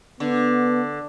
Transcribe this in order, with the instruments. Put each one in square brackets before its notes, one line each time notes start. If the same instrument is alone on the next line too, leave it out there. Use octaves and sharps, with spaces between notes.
[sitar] D3 [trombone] B3